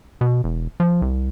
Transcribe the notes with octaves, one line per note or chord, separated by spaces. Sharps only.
B2
E1
F3
C2